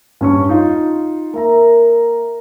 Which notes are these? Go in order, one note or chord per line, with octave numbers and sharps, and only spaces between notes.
G2 C#4 C#6
D#4 F4 C6
A#3 A#4 E5 A#5